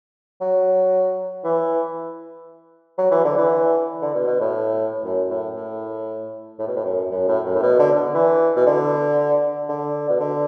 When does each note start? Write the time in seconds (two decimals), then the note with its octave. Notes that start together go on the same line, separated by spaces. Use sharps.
0.41 F#3
1.44 E3
2.98 F#3
3.11 E3
3.24 D3
3.37 E3
4.02 D3
4.15 B2
4.27 B2
4.40 A2
5.04 F#2
5.30 A2
5.56 A2
6.59 A2
6.68 B2
6.76 A2
6.85 F#2
7.11 F#2
7.28 A2
7.46 F#2
7.55 A2
7.62 B2
7.79 D3
7.96 D3
8.14 E3
8.56 B2
8.66 D3
9.69 D3
10.09 B2
10.20 D3